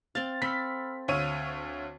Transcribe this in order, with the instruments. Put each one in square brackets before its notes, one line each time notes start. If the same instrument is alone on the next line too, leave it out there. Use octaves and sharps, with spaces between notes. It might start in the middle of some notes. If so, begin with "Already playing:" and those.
[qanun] C4 F5 [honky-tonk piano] A6
[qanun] C4 A4 [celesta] B5 E6 F6 [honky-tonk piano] B6
[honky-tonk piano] D2 C#5 D#7 [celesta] F5 E6 F6